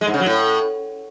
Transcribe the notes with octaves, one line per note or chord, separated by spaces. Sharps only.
G#3
G#2
C#3
F#3
A2